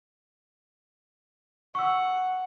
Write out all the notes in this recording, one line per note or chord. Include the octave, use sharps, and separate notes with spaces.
F#5 C#6 E6